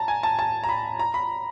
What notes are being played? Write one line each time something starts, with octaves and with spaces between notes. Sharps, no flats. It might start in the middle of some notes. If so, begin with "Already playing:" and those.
Already playing: A5 A#5
G#5
A5
A5
A#5
B5
A#5
B5